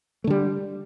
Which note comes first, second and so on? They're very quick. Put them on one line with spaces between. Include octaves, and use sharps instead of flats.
A3 D3 G3